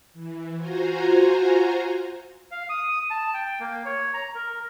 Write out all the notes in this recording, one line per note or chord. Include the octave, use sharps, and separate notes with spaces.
E3
F4 F#4 C5 G#5 A#5
F5
D#6
A5
G5
A#3
C#5
A#5
A#4